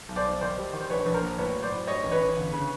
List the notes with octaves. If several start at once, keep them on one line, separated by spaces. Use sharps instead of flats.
B1
C5 D5
B1
D#3 C5 D5
G3
D#3
C5
A#1 B4 C#5
A#1 B4
A#4 C5
A#2
A2 B4 C#5
F#3
C5 D5
A2
G2 C#5 D#5
A1
B4 C#5
A1
G1
C#3